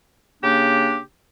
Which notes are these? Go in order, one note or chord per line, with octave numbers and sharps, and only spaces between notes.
C#3 A#3 D4 G4